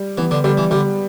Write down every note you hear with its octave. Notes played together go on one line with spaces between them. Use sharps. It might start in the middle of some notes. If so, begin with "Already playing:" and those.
Already playing: G3
E3 B3
D3
D3 G3
E3
D3 G3